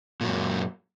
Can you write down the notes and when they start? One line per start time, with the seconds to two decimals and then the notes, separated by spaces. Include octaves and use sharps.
0.21 A#2
0.24 F#3
0.27 F#2